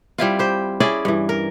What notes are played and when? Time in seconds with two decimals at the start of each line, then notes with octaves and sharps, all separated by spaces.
0.18 G3 C4 E4 F4
0.39 G4 C5
0.80 C#4 E4 G#4 D5
1.05 G2 E3
1.29 A#4